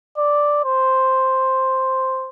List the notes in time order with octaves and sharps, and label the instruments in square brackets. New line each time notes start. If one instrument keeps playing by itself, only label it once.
[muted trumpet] D5
C5